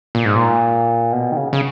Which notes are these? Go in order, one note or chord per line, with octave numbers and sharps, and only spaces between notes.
A#2
G#2
A#2
B2
D#3
C#3
C#3